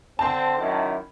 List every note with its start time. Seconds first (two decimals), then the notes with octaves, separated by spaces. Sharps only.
0.19 D3 C4 A5 C6
0.59 F#2 D#3 E4